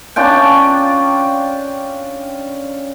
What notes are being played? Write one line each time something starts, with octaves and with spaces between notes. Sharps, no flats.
C#4 D4 F4 G5